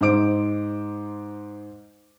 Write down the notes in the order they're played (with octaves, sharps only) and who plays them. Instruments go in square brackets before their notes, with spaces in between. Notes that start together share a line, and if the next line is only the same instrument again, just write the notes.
[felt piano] G#2 D#4 C5 D6 D7